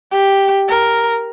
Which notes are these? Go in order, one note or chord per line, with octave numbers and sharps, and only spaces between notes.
G4
A#4